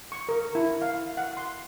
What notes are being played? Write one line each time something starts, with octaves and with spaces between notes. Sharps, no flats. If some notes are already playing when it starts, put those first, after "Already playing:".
C#6
A#4
E4
F5
F#5
C6